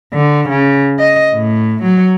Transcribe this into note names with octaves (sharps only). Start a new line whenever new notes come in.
D3
C#3
D#5
A2
F#3